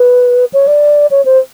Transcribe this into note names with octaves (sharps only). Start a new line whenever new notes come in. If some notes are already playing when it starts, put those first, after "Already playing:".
Already playing: B4
C#5
D5
C#5
C5